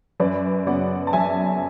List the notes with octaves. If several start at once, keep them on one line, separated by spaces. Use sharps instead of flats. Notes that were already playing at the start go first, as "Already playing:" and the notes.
F#2 B4 D5
C#3 F#3 B3 D5 F#5
A5
F#2 E5 G#5